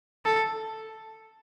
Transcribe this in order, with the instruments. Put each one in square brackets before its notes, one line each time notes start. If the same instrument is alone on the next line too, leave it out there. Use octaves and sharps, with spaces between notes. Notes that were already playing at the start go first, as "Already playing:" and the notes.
[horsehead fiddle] A4